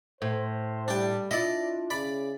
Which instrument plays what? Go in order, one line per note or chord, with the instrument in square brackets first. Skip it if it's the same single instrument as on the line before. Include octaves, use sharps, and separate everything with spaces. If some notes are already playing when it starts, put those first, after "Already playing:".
[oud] A2 [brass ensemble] C5
[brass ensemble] G3 [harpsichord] D4 G5
[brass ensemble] D4 F4 [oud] E4 [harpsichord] D5 D#5
[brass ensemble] C#3 [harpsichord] D5 B5